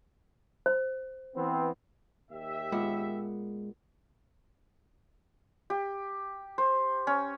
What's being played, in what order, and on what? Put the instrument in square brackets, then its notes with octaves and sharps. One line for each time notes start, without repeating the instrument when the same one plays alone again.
[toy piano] C5
[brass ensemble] E3 B3 C4
D#2 G4 E5
[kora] A#2 B3 [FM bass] G#3
[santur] G4
C5
C#4